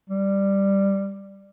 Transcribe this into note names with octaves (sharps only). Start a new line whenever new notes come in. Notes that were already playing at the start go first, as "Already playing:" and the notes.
G3